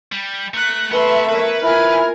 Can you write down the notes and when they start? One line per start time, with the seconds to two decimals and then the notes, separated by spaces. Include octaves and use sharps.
0.12 G3
0.54 A3 A#5 F#6
0.91 A3 B3 B4 E5 C6
1.29 A#4 B4 C#5
1.63 E4 F4 A#4 G#5 F6